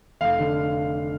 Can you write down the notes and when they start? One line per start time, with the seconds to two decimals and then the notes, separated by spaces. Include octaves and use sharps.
0.21 F1 F5
0.39 D3